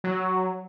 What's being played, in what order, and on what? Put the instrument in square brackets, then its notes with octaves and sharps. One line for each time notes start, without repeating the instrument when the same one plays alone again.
[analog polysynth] F#3